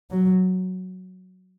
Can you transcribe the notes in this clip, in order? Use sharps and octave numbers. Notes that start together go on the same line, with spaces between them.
F#3